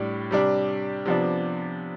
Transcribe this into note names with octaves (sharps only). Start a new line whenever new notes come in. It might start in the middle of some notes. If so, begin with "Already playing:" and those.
Already playing: A2 G3 D4
C3 G3 D4
C3 F3 B3 D4